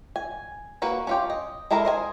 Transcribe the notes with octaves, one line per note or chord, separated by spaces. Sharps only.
G#5
A#3 F#4 B4
C#4 F4 G4
D#5
G#3 E4 A4 A#4 A#5
C5 D#5 G#5